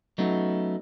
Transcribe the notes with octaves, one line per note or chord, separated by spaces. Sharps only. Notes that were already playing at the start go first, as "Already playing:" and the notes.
F#3 A3 B3 C#4 D#4